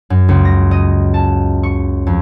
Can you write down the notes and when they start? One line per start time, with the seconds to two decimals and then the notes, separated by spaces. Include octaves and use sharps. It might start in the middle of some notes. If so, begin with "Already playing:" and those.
0.10 F#2
0.29 C#2
0.45 A#6
0.71 D#5
1.14 A5
1.63 C#6
2.07 F2